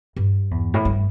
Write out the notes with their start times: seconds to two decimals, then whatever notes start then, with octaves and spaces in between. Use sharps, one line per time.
0.16 G2
0.51 E2
0.74 A2
0.85 G2